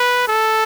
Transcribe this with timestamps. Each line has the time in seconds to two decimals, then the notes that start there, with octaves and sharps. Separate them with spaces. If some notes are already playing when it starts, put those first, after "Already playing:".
Already playing: B4
0.28 A4